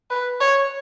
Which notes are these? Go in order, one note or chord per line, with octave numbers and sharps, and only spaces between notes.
B4
C#5